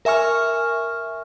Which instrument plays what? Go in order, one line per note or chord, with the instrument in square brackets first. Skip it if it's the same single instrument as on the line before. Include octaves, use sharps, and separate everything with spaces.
[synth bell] A#4 E5 G#5 C#6 F6